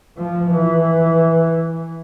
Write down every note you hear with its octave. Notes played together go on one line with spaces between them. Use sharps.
F3
E3